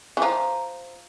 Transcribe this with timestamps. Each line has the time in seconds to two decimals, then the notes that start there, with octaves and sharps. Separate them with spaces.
0.17 E3
0.22 F3 A#5